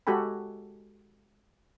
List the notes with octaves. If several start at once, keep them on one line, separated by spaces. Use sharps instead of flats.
G#3 F#4 G4 A4 G#5 B5